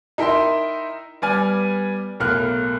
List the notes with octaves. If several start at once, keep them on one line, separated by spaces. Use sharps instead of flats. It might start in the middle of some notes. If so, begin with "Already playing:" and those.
D#4 E4 A#4 E5 G5 C6
G3 B3 D5 G#5 F6
B1 A2 A#3 F6 F#6